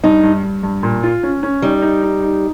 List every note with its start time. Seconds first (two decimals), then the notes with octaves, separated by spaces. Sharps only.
0.04 G2 D#4
0.23 G2
0.43 G2
0.63 G2
0.83 A#2
1.03 F4
1.23 C#4
1.43 C#4
1.62 G3 D#4
1.82 D#4
2.03 D#4
2.22 D#4